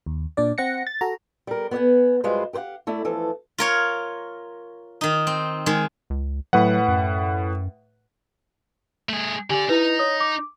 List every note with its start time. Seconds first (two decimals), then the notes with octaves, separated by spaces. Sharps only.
0.06 D#2
0.37 A#2 D4 D5
0.58 C4 F#5 A#6 C#7
0.87 A6
1.01 F#4 A4 A#5
1.47 G3 A#4
1.71 B3 C5 D5 F#5 G#5
2.24 F#2 G3 G#3 F4 B4 C5
2.53 G4 B4 C5 F5 F#5
2.87 A3 E4 D5
3.05 E3 F3 A4
3.58 F4 A#4 C#5
5.01 D#3 D#4
5.27 C4
5.66 D#3 G#3
6.10 C#2
6.53 A2 F#3 B4 F#5
6.88 F#2
9.09 A3 G#4
9.50 D3 G4 D5 G#5
9.69 D#4 E4 B4
9.99 C#5 D#6
10.21 D6